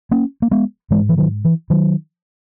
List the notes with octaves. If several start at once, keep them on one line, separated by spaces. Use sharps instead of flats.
A#3 C#4
A#3
G#3 B3
G#2 E3 G#3
E3
D#3 F#3
E3
D#3 F#3